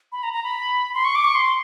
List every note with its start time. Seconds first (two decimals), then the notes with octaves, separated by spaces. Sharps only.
0.12 B5
0.23 A#5
0.33 A#5
0.44 B5
0.94 C6
1.05 C#6
1.15 D6
1.25 C#6
1.35 C6